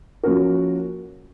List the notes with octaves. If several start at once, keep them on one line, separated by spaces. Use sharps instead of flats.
F3 A#3 C#4 F#4 A#4